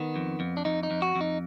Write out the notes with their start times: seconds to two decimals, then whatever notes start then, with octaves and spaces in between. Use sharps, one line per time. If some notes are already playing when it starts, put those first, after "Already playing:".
Already playing: D#3 B3
0.16 F2
0.40 F2
0.57 D4
0.65 F2 D#4
0.83 D#4
0.91 F2
1.02 F#4
1.16 F2
1.21 D#4